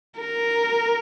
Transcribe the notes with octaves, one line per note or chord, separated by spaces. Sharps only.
A#4